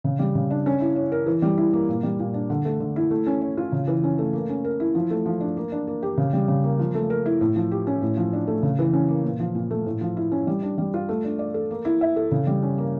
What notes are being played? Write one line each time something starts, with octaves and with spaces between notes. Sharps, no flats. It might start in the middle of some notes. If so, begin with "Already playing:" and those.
C#3
G3
C#3
D4
C#4
E4
C#5
A#4
E3
G3
E4
A#3
A#2
G3
A#2
D4
D3
A3
D3
E4
A3
C#4
C#5
F4
C#3
E3
C#4
A3
A#3
C#4
A#4
E4
F3
A3
F3
D4
A#3
D4
A#3
G4
C#3
G3
C#3
A#3
F3
A3
A#4
E4
A2
F3
G4
C#4
A2
F3
D4
A3
C#3
E3
C#4
A#3
A#2
F3
A#2
A3
A2
F3
E4
C#4
G3
D4
G3
F4
A3
D4
D5
A4
A#3
E4
E5
A4
C#3
G3
C#4
A#3